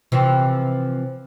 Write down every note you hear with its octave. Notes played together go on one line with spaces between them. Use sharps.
C3 E3 F3